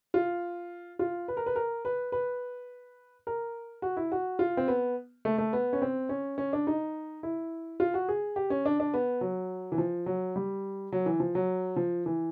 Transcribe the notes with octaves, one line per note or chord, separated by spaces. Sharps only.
F4
F4
B4
A#4
B4
A#4
B4
B4
A#4
F#4
E4
F#4
F4
C4
B3
A3
A3
B3
C#4
C4
C#4
C#4
D4
D#4
E4
F4
F#4
G#4
G4
C#4
D4
D4
B3
F#3
E3
F3
F#3
G3
F#3
E3
F3
F#3
F3
E3